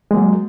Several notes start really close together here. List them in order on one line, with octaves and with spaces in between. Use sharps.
G#3 A#3 F#3